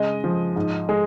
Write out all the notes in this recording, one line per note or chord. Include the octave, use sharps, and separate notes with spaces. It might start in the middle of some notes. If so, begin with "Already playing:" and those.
Already playing: C#3 G#3 D#5
F3
G#2
G#3